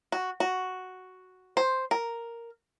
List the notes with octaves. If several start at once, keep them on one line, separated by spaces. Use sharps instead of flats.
F#4
F#4
C5
A#4